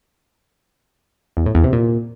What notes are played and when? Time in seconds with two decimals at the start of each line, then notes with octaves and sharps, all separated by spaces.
1.37 E2
1.46 A2
1.55 E2
1.64 C3
1.73 A#2